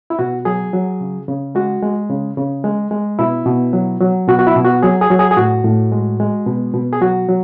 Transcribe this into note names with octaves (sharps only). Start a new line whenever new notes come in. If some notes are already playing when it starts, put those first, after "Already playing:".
E4
B2 F#4
F#3 G#4
F#3
C#3
C#3
G#3 F#4
G#3
C#3
C#3
G#3
G#3
B2 E4
B2
F#3
F#3
B2 F#4
F#4
E4
B2
F#4
F#3 G#4
G#4
F#3
G#4
G#4
A2 F#4
A2
G#3
G#3
B2
B2
G#4
F#3 F#4
F#3